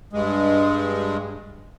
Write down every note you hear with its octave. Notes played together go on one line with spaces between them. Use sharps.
G2 G#3